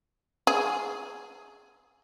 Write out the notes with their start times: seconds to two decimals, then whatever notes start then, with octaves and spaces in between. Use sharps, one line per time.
0.47 G#4